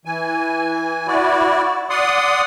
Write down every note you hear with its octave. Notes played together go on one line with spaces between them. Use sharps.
E3 G#5
E4 F#4 D5
D5 F#5 C6 D#6